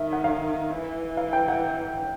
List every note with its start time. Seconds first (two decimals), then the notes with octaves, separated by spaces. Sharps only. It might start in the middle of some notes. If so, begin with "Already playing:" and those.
Already playing: D#3 E5
0.13 F#5
0.24 F5
0.71 E3
1.17 F5
1.33 G5
1.48 F#5